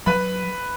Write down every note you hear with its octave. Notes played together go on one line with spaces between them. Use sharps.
F#3 B4 B5